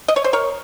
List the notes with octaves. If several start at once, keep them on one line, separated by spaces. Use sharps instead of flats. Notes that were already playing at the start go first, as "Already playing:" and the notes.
D#5
C#5
C5
A#4 C#5